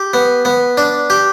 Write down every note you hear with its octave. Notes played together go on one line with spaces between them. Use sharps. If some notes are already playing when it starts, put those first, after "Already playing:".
Already playing: G4
B3
B3
D4
G4